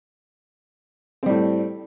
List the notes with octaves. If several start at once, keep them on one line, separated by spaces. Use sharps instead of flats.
A2 G3 C4